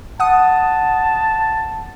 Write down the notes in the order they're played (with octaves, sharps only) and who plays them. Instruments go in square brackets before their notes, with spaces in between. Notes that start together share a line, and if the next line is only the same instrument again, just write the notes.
[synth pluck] F#5 D#6 [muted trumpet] A5